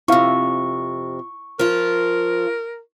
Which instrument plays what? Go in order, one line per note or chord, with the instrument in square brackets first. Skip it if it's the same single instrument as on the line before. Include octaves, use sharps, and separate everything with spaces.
[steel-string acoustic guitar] F2 C3 [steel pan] E4 F5 [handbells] C#6
[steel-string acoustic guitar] F3 F4 [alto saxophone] A#4